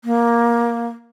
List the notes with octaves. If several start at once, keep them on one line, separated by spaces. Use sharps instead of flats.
A#3